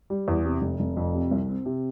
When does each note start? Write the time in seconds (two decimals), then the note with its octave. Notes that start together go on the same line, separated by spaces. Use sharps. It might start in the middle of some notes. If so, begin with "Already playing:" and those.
0.10 G3
0.28 E2
0.45 C3
0.62 F1
0.80 F1
0.97 F2
1.14 C3
1.31 C2
1.49 C4
1.66 C3